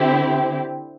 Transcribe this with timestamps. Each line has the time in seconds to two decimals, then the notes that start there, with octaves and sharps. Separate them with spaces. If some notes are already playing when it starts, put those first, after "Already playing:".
Already playing: D3 C4 E4 G4